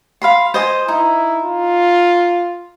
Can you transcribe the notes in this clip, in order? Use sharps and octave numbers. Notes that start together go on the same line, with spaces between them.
F5 B5 C6
C5 D#5 G#5
D#4 E4
F4